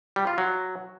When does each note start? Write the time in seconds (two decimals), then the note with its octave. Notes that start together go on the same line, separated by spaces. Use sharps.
0.16 G3
0.27 F4
0.38 F#3